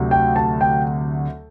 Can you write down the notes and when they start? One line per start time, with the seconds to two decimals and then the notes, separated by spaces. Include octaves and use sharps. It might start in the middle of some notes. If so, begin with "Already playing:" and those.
Already playing: D2 C3 F#3
0.11 G5
0.36 A5
0.61 G5